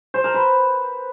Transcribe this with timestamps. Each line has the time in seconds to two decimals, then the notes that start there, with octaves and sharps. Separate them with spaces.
0.14 C5
0.24 A#4
0.34 B4